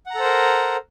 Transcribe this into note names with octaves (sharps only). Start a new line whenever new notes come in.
A4 A#4 C5 F#5 A#5